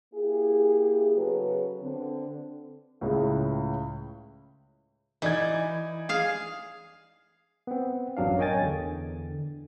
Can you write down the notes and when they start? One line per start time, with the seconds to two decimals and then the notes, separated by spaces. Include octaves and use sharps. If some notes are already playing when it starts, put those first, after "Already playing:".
0.14 A#3 E4 G4 G#4
1.15 C#3 F#3 B3 F#4 A4 B4
1.80 D3 C4
3.01 C#2 A2 C#3 G#3
5.22 E3 D#4 D5 G#6
6.09 G#4 F5
7.67 B3 C4
8.17 A1 F#2 F#3 D4 F5
8.38 A#4 C#5 D#5 G5 G#5 A6
8.60 E2 D3